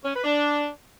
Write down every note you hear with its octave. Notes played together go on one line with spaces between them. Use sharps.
C#4
B4
D4